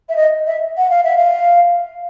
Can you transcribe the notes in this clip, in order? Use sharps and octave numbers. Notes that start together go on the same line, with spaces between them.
E5
D#5
E5
F#5
F5
E5
F5